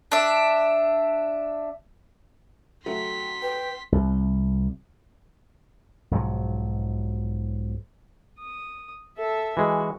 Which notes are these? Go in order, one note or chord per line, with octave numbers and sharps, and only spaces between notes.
D4 E5
F#3 A3 G5 C6 B6
B4 G5
C2
B1 G#2 F3 F#3
D#6
A4 E5
E3 G#3 F#4